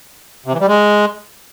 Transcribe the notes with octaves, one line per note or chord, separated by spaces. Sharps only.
C3
E3
G3
G#3